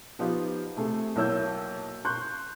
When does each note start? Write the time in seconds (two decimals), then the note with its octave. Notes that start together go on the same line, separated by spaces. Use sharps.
0.19 F3 B3 D#4 F4 G4
0.76 C3 A3 G#4
1.16 B1 A#3 E4 C#5 E6 G6
2.05 C6 C#6 F#6 G6